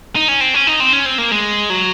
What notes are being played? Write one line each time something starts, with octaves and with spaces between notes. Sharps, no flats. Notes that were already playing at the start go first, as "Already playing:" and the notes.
D#4
C#4
C4
C#4
D#4
C4
C#4
C4
A#3
G#3
F#3